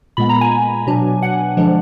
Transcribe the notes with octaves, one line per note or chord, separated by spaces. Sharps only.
A#2 G#3 B3 B5
A#5
G#5
B2 F#3 D4
F#5
D3 F3 G#3 D4